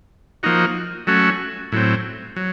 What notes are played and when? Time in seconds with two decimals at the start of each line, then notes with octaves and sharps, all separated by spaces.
0.43 F3 A#3 D#4 F#4
1.07 F#3 A3 C#4 F#4
1.72 A2 F#3 C4
2.36 F#3